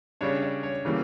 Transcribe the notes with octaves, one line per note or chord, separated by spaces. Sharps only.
C#3 G3 D4 C#5
D5
C#5
C#3 E3 G3 A#3